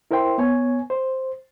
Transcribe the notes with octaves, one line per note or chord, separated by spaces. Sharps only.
E4 A#4 C5 E5 G5 C6
B3 C#5 G#5
C5